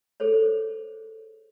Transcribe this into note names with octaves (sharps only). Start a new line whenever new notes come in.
G#4 A4 C5 C#5